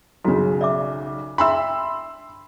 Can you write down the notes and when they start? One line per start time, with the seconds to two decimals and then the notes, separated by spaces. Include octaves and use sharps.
0.25 B1 C#3 F#4
0.61 D5 E5 D6
1.38 D4 E5 B5 C6 E6